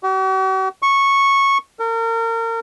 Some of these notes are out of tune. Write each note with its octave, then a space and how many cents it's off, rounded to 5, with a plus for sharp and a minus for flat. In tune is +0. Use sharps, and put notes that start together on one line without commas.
F#4 +45
C#6 -10
A#4 -35